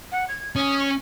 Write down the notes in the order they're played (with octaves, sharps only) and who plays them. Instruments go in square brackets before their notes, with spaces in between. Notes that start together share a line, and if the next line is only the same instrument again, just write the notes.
[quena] F#5
G#6
[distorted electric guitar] C#4 [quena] D#6
[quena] C#6